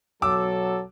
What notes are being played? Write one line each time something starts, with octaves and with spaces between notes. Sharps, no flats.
B1 F#3 A4 D6 E6